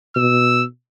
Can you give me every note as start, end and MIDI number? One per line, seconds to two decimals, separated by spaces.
0.16 0.63 47
0.16 0.64 88